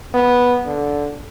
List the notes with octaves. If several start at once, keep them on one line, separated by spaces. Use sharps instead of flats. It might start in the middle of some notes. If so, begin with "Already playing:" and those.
B3
D3